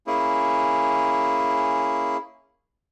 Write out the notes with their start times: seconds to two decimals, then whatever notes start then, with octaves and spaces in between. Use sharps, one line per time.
0.07 A#3 C#4 E4 G#4